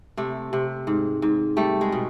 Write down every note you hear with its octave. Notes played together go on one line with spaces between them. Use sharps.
C3 A3
C3
G#2
G#2
G3 A3
G#3
B2